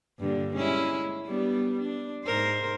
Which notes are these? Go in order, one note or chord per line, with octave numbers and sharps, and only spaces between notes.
G2 A#2 D3
G#3 C#4 E4
G3 B3 D4
D4
G#2 A#4 C5